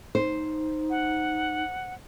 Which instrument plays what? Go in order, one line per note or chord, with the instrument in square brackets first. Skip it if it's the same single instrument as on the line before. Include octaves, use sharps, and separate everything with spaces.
[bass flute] D#4 [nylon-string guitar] C5
[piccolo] F#5